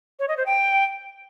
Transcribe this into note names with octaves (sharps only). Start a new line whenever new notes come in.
C#5
D#5
C5
G5